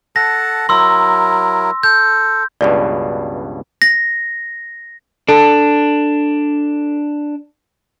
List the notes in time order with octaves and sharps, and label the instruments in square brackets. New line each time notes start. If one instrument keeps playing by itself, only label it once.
[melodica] A4 F#5 A5 [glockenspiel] A#6
[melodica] F#3 E4 A#4 [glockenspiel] C6 E6
[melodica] A4 [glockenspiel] G6
[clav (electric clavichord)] C#2 G2 B2 [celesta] D5
[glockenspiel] A#6
[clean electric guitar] D4 [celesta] A4 A5